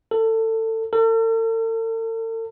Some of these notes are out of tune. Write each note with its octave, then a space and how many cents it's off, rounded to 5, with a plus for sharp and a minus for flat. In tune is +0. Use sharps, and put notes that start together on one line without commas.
A4 +25
A4 +45